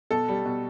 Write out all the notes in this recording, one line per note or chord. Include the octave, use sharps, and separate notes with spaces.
B2 A4
G3
B2